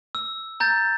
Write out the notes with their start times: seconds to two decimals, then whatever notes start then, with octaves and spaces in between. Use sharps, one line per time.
0.15 E6
0.60 A#5 G6 A6